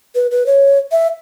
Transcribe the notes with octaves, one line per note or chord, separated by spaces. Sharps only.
B4
B4
C#5
E5